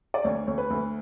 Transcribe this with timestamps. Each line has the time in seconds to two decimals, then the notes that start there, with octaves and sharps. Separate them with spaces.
0.14 D5
0.24 D2 C#5
0.47 D2 C#5
0.58 B4
0.70 D2